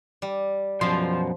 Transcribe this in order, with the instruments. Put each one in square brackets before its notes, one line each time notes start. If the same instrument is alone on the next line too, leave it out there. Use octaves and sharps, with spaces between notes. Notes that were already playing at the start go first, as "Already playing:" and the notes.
[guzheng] G3
[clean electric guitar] F#2 B2 C6 [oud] F3